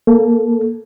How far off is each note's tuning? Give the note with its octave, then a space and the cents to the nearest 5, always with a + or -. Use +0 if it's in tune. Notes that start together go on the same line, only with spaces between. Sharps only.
A#3 +0 A4 -15